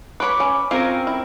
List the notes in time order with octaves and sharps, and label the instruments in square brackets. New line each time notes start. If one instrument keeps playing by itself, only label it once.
[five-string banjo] B4 C#5 [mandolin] B5 C6 D6
[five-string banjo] C#4
[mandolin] C4 C#4 A#4 [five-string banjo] F4
[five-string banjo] E4